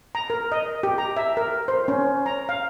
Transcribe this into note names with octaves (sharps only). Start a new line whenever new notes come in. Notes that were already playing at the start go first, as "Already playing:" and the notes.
A#5
A#4
D#5
G4
A#5
E5
A#4
C5
C#4
A#5
F5